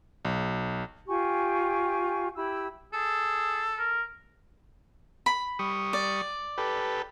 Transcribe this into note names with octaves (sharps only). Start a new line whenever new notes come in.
B1
F4 G4 G#5 C#6
E4 G4 B5 E6
G#4 A4
A#4
B5
G3 C#6 D#6
D5
G4 A4 B4